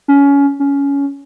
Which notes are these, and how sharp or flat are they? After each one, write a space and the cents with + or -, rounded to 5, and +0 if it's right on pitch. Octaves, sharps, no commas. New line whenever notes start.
C#4 +20
C#4 +15